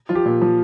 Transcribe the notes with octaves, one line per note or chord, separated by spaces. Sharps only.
F3 F4
G4
A#2
F3